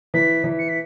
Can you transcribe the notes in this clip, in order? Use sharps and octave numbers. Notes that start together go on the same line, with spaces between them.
E3 B6
E3
C#7
B6